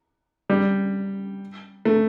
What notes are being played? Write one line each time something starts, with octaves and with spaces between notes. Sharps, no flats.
G3
A3